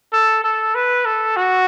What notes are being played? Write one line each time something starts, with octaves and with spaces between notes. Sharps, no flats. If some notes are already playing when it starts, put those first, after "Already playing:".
A4
A4
B4
A4
F#4